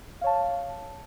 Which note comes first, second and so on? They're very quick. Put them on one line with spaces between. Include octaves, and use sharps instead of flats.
F5 C#5 A5